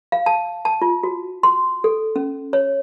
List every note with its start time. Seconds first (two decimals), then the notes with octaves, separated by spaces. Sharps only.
0.12 F5
0.26 A5
0.65 A5
0.82 F4
1.03 F#4
1.43 C6
1.84 A4
2.16 C#4
2.53 C#5